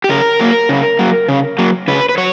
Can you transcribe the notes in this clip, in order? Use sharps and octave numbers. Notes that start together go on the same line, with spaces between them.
G4
C#3 A#4
F#3 A#3
C#3
F#3 A#3
C#3
F#3 A#3
C#3 B4
B4
F#3 C#5